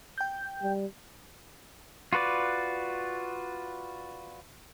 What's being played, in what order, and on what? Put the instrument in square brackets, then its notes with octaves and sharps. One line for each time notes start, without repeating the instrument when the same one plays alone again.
[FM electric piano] G5 G6
[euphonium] G3
[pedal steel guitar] F4 F#4 B4 D5